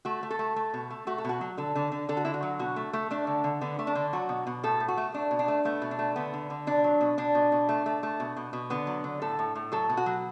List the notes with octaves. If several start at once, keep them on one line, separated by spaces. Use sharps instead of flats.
A3 F#4
A3
A4
A3
A3
B2
A3
A3 F#4
A4
B2 F#4
F#3
D3 A4
D3
D3
D3 A4
F#4
D3 E4
F#4
F#3
B2 F#4
A3
A3
A3 D4
D3
D3
D3 B3
A3
D4
D3
F#3 F#4
B2
B2
A2 A4
A2
F#4
A3
A3 D4
B2
D4
A3
A3 B3
B2
D4
A3
D3 B3
D3
D3
B2 D4
F#3
B2
B2 D4
B2
B2
A3
A3
A3
B2
B2
B2
D3 B3
F#3
D3
A2 A4
A2
A2
F#3 A4
B2
F#4
F#3